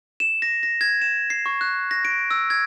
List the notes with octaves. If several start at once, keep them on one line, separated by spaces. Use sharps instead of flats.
E7
A#6
A#6
G#6
E7
C7
C#6
F#6
A#6
D7
E6
G#6